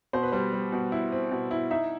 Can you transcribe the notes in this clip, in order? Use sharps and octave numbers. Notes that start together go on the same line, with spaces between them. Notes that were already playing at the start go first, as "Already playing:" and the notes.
B2 C5
B4
G3 C5
G3
B2
E4
C4
B2
E4
D#4 E5